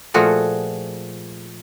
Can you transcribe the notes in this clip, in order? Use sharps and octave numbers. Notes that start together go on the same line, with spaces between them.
A#2 F3 A3 F#4 G#4